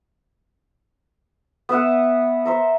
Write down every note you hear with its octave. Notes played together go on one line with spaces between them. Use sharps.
B3 B4 E5 F#5
C5 E5 A#5